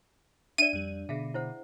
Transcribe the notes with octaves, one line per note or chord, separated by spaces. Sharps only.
D4 D5 E5 D#7
F2 G3
B2 D3 G#4 E5 F5
E4 C5 F#5